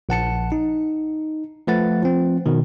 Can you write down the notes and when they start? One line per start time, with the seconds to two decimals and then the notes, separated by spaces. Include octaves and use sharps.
0.09 A#1 F#5 A5 C#7
0.52 D#4
1.67 F3 A3 B4 F#5 A6
2.03 F3 C4
2.46 B2 D#3